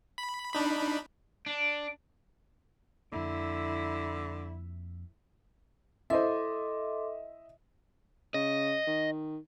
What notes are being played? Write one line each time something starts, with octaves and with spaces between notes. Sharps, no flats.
B5
D4 D#4 B5
D4
F2 D3 A#3 E4
E4 A4 C5 D#5 E5 C6 D6
C#3 D#5
D#3